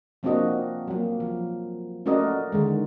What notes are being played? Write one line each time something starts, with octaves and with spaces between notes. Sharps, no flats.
F3 A#3 C4 D4 F#4 D#5
F#3 A#3
F3
A3 C#4 F#4 A#4 D5 D#5
D3 D#3 G#3